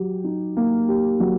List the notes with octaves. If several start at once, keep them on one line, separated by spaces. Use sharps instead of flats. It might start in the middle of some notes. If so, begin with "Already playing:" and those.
Already playing: F#3 G4
D#4
A#3
G4
F#3